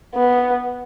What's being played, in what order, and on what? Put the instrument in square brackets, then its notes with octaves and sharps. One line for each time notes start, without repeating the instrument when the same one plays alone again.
[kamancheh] B3